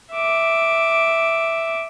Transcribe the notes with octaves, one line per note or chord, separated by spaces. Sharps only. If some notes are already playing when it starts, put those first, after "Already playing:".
E5 D6